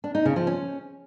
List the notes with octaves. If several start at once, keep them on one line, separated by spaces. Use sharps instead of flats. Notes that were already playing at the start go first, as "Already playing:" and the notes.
D4
D#4
C#3
F3
C#4